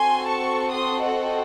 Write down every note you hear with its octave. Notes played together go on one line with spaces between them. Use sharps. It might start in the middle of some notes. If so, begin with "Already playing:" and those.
Already playing: C4 F#4 A4 G#5 C6
A5 C#6
C6 D#6
D#5 F#5